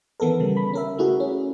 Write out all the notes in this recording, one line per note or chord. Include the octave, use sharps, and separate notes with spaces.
D#3 E3 B3 A4 A#4
C#3 G3
B5
C#4 A#4 E5
A3 E4 F#4 G#4
C#4